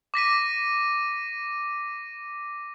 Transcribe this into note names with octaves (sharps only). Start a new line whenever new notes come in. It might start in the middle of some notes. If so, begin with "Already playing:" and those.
D6 A#6 B6 D#7